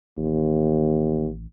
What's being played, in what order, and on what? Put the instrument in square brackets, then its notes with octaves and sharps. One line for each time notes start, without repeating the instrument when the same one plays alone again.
[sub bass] A1 [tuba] D#2